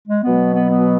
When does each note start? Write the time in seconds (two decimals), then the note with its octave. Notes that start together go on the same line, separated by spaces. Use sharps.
0.08 G#3
0.23 B2 F#3 B3
0.54 B3
0.69 B3